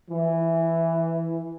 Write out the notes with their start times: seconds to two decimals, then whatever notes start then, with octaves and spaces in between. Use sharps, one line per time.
0.10 E3